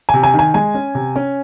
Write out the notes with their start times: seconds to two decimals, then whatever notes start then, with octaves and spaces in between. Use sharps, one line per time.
0.09 C3 G#5
0.23 G#5
0.34 D#3
0.39 G#5
0.54 G#3 G#5
0.74 C#4
0.95 C3
1.16 C#4